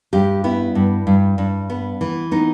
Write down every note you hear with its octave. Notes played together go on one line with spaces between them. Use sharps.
G2 G4
B3 E4
G2
G2
G2
B3
E3
B3 D#4